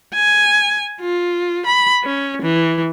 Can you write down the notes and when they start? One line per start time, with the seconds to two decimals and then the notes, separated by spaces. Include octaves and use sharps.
0.14 G#5
1.01 F4
1.66 B5
2.04 C#4
2.42 E3